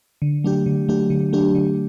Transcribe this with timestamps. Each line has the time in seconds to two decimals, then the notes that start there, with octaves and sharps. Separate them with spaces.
0.22 D3
0.44 F#3 A3 D4 G4
0.66 D3
0.89 F#3 A3 D4 G4
1.10 D3
1.33 F#3 A3 D4 G4
1.55 D3